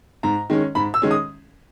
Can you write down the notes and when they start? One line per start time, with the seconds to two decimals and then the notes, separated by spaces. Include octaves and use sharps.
0.23 G#2 A#5
0.50 D#3 G#3 C#4
0.75 G#2 B5
0.94 E6
1.02 D#3 G#3 C#4
1.11 D#6